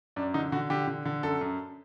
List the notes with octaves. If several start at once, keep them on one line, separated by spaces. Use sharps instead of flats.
F#2 D4
D3 D#4
D3 F#4
D3 G4
D3
D3
F#2 A4
F#2